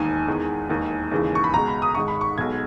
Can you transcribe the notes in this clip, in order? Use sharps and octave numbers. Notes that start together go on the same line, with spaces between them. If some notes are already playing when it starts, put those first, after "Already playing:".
Already playing: E1 D#2 D#3 G#5
E2 D#3 G#3
E1 D#2 D#3
D#2 C#3 E3 G#3
C#6
B5
C#2 B2 G#3 A#5
B5
D#6
G#1 G#2 D#3 G#3 C#6
B5
C#6
B1 B2 G#3 G#6